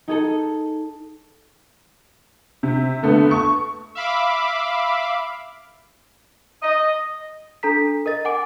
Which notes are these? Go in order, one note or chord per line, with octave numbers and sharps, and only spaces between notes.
D#4 G#4 A4
C3
D3 A3 B3
C#6
E5 F5 B5 D6
D#5
D4 A4 A#5 B6
A#4 D#5 A6
F#5 G#5 D6 D7